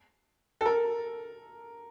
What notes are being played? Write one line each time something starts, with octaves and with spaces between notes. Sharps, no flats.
A4
A#4